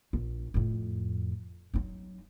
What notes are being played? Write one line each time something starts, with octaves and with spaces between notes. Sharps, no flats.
A#1
F2 A2
F#3 D#4